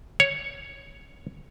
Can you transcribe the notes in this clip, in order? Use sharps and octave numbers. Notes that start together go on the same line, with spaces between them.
C#5